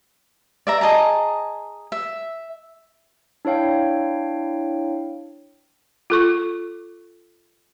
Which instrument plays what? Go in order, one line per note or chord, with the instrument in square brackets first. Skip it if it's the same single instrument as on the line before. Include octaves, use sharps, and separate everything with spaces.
[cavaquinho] D5 E5 A#5
G#4 D#5 A5 A#5
E5
[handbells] D4 E4 C#5 F5 G5
[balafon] F4 A4 C#6